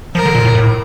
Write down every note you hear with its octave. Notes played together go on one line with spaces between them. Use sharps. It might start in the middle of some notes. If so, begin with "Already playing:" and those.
F3 A#4
D3
A#2
A2
A2